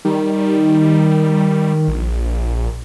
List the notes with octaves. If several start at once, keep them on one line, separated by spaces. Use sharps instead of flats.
D#3 G3
A#1